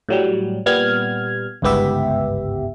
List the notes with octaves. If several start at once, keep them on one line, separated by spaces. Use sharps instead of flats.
A2 F#3 G3
A#2 G3 B3 F6 G#6
G1 C#2 G#2 B3 G4 E5